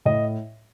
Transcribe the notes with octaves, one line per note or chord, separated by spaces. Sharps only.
A2 D#5